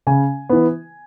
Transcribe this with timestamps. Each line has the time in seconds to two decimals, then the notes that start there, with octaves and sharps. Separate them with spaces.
0.07 C#3 G#5
0.49 E3 B3